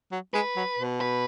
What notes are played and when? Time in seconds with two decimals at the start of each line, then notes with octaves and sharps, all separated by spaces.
0.12 F#3
0.34 G#3 B4
0.56 F#3
0.79 B2
1.01 B4